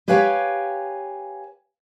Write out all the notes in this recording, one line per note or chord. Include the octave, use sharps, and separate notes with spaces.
G4 B4 C#5 F5 G5 G#5